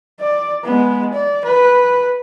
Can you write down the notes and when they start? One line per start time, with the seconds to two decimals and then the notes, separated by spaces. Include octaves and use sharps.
0.21 D5
0.64 G#3 B3
1.13 D5
1.45 B4